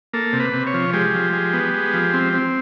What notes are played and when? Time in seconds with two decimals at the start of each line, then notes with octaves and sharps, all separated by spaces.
0.13 A#3 A4
0.33 C3
0.40 B4
0.53 C3
0.67 C#5
0.74 F3
0.93 G#3 G4
1.14 F3
1.33 G#3
1.53 B3
1.74 G#3
1.93 F3
2.14 C4
2.33 C4